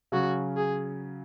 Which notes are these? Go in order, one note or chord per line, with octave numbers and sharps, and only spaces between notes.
C#3 F#3 C#4 F#4
G#4